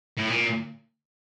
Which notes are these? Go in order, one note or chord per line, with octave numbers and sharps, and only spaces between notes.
A2
A#2